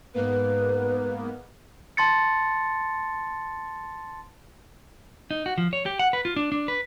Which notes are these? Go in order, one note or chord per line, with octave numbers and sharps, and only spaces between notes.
G#2 A#3 B3 B4
A5 C6 A6 C#7
D#4
F#4
F3
C#5
G4
F#5
B4
F4
D4
D4
B4